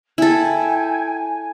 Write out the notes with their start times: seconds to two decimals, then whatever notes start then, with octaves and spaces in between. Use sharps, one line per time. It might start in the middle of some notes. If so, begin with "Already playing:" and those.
0.18 E4 A4 G5 G#5
1.11 G#5